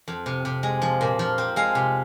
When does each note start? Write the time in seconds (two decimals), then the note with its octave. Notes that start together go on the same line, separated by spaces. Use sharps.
0.08 F2
0.26 C3
0.45 C3
0.63 G#3
0.82 F3
1.01 A#2
1.19 F3
1.38 C4
1.56 G#3 F5
1.75 C3